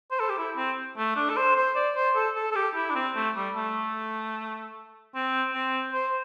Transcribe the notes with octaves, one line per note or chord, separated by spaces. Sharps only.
C5
A4
G4
E4
C4
A3
D4
A4
C5
C5
D5
C5
A4
A4
A4
G4
E4
D4
C4
A3
G3
A3
C4
C4
C5